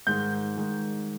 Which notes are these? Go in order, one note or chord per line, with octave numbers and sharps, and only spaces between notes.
G#2 D#3 G#3 G6
G#2 D#3 G#3